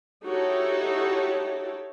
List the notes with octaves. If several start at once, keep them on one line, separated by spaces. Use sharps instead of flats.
D#4 E4 F#4 G4 A4 C#5